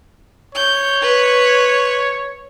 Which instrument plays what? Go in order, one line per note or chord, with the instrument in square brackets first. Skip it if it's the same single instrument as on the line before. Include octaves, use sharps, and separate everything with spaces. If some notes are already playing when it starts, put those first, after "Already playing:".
[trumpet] C#5 [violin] G6
[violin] B4